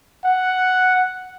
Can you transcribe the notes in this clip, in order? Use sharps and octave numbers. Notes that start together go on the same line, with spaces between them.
F#5